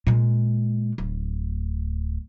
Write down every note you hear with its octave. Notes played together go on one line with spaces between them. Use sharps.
A#2 G#3
D1